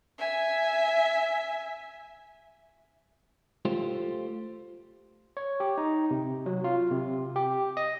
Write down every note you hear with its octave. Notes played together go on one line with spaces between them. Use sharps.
E5 G#5
A3 F4 G4 C5
C#5
G4
D#4
C3
F#3
F4
C3
G4
D#5